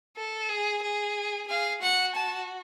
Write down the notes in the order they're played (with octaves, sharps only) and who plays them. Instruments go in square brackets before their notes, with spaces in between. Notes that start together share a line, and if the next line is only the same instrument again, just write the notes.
[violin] A4
G#4
G#4
[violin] G#4 [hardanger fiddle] F5
[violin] F#4 [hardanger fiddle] F#5
[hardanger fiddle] A5